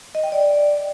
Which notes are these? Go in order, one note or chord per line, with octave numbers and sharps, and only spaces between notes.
D#5
G5
D5